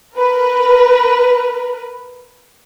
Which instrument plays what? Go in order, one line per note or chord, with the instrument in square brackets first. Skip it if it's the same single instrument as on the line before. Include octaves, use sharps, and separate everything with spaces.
[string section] A#4 B4